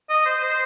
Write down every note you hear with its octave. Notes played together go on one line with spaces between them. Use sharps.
D#5
C5
C5